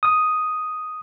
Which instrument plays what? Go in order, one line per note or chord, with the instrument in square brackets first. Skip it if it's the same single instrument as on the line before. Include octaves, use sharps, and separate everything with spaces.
[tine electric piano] D#6